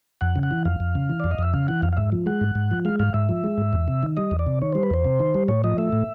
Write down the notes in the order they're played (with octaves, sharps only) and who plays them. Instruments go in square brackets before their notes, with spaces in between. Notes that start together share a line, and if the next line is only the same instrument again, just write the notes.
[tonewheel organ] F2 F#5
C#3
F#5
E3
F2 F5
F2
C#3
E3
F2 D5
D#5
F2 E5
C#3 F5
E3 F#5
F2 F5
F5
G#2 E5
F3
G#3 F#5
G#2
G#2
F3
G#3 F5
G#2 F5
G#2 E5
F3
G#3
G#2
E2
C3
D#3
G3 D#5
E2
D5
C3
D#3 C#5
G3 C5
B4
E2 C5
C3
D#3
G3
A2 C#5
F3 D#5
A3 E5
A2